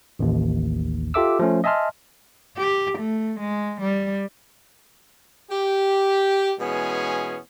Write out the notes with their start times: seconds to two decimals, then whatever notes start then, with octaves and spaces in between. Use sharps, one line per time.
0.19 A1 D#2
1.14 F4 G4 A4 E5 D6 E6
1.39 F3 A3 C#4
1.64 D#5 E5 G#5 A5 C6 F6
2.57 G4
2.98 A3
3.40 G#3
3.82 G3
5.51 G4
6.60 B2 E3 G#3 B3 C#4 G#4